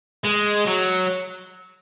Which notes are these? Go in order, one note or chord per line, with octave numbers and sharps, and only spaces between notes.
G#3
F#3